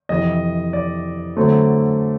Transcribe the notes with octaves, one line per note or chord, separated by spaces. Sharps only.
F2 C3 E3 D#5
D5
D3 F#3 A3 C4